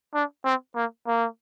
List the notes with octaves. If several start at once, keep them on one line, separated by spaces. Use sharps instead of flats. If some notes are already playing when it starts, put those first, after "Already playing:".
D4
C4
A#3
A#3